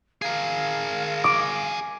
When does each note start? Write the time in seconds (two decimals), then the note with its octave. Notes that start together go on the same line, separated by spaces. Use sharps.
0.22 G#4 A#4 F5
1.24 D6